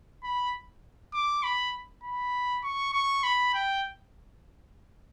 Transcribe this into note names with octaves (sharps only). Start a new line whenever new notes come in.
B5
D6
B5
B5
C#6
C#6
B5
G5